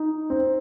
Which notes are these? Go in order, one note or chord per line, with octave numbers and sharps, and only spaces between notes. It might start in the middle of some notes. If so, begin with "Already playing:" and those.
Already playing: D#4
C4